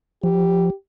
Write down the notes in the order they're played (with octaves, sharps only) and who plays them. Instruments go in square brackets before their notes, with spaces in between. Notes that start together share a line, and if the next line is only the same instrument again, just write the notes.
[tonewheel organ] F3 [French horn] G4